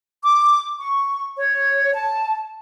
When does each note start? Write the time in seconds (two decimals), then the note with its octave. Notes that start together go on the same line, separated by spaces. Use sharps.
0.24 D6
0.79 C#6
1.37 C#5
1.94 A5